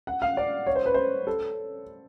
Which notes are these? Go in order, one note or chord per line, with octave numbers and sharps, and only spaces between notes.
F#5
F5
D5
C#5
C5
B4
C5
A4